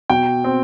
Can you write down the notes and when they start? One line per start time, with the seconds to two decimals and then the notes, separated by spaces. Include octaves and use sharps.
0.10 B2 G5
0.44 C4